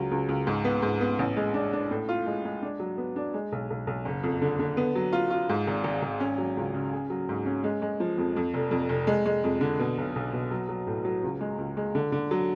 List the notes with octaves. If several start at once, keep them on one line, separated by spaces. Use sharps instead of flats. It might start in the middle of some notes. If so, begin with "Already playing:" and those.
Already playing: C#2 F#3
C#2
C#2
G#2
B3
G#2
B3
A1
G#3
D4
D4
A2
F4
G#3
G#3
D4
F#3
B3
D4
G#3
B1
B1
B1
F#1
F2
D3
D3
B3
F#3
F4
F4
G#2
G#1
G#1
G#1
C#4
F#3
C#2
C#3
G#4
F#3
G#2
C#4
G#3
G#3
F3
F2
F2
F1
F2
F1
G#3
G#3
F2
D3
B2
B1
B1
B2
F#3
F#3
A2
F#3
C#2
G#3
C#2
G#3
D3
D3
F#3